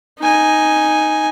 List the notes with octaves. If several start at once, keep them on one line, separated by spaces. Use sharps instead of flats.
D#4 G#5